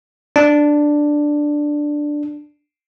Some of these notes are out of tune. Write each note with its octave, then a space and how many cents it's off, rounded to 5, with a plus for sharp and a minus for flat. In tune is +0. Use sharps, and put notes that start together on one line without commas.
D4 +5